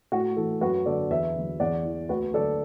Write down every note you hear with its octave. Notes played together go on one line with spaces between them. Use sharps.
A2 F#4
E3 A4
F#2 F#4 B4
D3 F#3 A4 D5
E2 B4 E5
D3 F#3
E2 D5 F#5
E3
D2 F#4 B4
D3 F#3 A4 D5